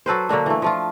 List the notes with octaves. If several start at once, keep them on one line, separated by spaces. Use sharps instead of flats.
F#3 A4 B4 C5
D3 F#3 A#3 D4
E3 A3
F3 A3 F4